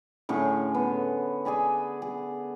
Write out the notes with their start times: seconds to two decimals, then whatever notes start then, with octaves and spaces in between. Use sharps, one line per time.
0.29 A2 D3 C#4 G#4
0.74 B3
1.45 G#4 D5 G#5 B5
2.02 G#4